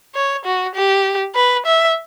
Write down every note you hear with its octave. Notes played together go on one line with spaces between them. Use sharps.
C#5
F#4
G4
B4
E5